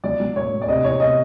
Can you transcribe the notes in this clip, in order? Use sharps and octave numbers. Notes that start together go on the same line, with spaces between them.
F#3 D5
F#3
A2 C#5
A2
D5
C3 D#5
E3 C#5
C3 D#5